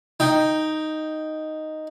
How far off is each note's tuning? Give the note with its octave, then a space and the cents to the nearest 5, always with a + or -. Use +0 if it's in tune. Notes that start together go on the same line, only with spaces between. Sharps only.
D#4 +0 G5 +0